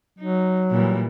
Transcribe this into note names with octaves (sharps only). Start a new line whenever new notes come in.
F#3 D#4
A#2 E3 G3